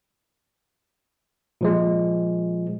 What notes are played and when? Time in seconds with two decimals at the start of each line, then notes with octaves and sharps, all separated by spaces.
1.61 A#2 F3 G#3